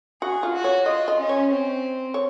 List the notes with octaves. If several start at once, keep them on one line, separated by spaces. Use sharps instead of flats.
F#4 G#4
F4
F#4
C#5
F4 D#5
D#5
C#4
C#5
C4
C#5